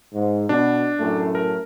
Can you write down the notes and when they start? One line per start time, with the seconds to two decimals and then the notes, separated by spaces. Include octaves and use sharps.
0.14 G#2
0.49 B2 D4
0.99 F#2 A2 A3
1.35 A#4